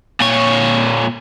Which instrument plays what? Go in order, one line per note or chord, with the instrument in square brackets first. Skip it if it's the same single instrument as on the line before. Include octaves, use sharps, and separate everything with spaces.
[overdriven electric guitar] A#2 C#5